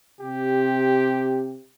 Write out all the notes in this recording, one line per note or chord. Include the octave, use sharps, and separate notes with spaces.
C3 G4